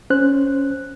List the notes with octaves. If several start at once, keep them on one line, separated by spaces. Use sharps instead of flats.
C#4 C5 F#6